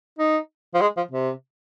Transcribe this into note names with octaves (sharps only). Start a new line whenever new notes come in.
D#4
F3
G#3
F3
C3